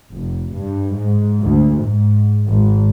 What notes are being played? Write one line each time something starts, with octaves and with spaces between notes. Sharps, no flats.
F1
G2
G#2
D2
G#2
G#1